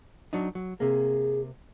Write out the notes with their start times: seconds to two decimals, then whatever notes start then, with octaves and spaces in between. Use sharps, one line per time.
0.33 F#3 D4 D#4
0.55 F#3
0.80 C3 A#3 G#4